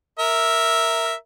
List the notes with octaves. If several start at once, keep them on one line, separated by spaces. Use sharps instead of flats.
A#4 E5